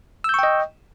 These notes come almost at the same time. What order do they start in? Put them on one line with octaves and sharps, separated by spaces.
E6 G6 C#6 G5 D#5